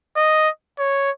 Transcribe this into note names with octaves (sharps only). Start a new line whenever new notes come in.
D#5
C#5